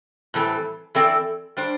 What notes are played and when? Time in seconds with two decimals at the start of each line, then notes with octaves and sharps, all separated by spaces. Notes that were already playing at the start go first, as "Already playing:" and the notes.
0.34 A2 E3 G3 C4 A4
0.95 E3 C4 A4 D5
1.57 G3 D4 C5